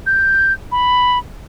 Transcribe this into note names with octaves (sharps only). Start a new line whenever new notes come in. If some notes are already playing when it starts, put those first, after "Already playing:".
G6
B5